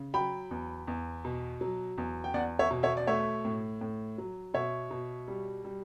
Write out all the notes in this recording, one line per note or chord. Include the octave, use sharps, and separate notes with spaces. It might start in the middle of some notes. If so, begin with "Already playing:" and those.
Already playing: C#3
F#3 G5 B5
E2
E2
B2
F#3
E2
G5
E2 D5 F#5
C#5 E5
B2
C#5 E5
D5
A3 C#5 E5
A2
A2
F#3
B2 C#5 E5
B2
G3
G3